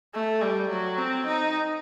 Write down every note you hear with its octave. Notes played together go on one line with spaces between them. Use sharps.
A3
G3
F#3
C4
D#4